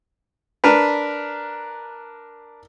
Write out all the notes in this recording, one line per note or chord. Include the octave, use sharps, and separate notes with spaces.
D4 A#4 B4